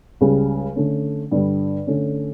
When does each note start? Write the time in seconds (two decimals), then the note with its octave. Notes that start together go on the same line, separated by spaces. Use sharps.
0.21 C#2 C#3 G3
0.76 D3 A3 C#4
1.31 G2 D3 G3
1.87 D3 A3 C#4